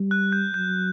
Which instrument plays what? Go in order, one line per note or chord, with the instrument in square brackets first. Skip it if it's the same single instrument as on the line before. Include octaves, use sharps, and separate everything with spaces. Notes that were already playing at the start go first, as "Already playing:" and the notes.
Already playing: [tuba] G3
[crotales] F#6
G6
[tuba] F#3 [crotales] G6